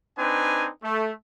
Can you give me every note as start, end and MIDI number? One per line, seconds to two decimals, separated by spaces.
0.18 0.69 60
0.18 0.69 62
0.18 0.69 63
0.18 0.69 71
0.18 0.69 80
0.83 1.12 57